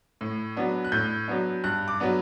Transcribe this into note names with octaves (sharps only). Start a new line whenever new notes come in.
A2
F#3 B3 D4
F#6
A2 G6
F#3 B3 D4
G2 F#6
D6
F#3 B3 D4